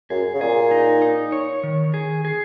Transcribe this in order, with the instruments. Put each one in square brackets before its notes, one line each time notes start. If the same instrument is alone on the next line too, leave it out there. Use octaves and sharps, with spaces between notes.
[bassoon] F#2 [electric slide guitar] G#4
[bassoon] C#3
[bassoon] A#2 [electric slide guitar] G#4
[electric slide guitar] D#4
D#4
C#5
D#3
G#4
G#4